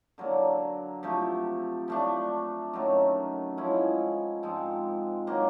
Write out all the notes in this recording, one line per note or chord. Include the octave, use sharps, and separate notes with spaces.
D3 F#3 A#3
C3 F3 A3
F3 A3 D4
F#2 D#3 F#3 A3
F3 G#3 C#4 E4
G#2 F3 G#3 C4
D#3 F#3 A#3